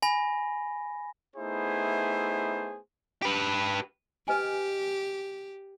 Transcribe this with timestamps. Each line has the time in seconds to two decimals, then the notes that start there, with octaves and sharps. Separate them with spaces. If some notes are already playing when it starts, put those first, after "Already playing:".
0.02 G#5 B5 A#6
1.36 A3 B3 D#4 E4 G#4 C5
3.22 G4 B4
4.28 G4 B4 D#5 G#5